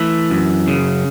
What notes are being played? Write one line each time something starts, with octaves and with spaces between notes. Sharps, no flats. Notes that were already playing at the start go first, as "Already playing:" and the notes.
Already playing: E3 A3
F#2
C#3